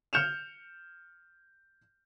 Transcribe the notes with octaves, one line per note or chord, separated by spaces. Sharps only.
F6 G6 C#7 E7 F7